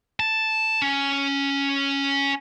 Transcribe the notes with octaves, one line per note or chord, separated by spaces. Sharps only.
A5
C#4